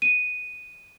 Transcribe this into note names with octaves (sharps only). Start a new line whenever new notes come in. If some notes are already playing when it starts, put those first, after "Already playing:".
D#7